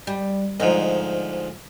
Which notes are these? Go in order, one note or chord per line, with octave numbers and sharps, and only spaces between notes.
G3
D2 G#2 F3 D#4